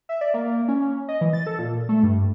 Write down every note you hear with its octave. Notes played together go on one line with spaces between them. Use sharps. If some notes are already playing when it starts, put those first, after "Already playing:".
E5
D5
A#3
C#4
D#5
E3
A6
A4
A#2
A3
G2